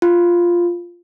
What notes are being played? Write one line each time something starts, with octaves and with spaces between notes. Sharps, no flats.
F4